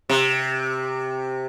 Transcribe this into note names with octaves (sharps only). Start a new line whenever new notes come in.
C3